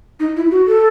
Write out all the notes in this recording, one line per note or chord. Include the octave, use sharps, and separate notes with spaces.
D#4
E4
F#4
A4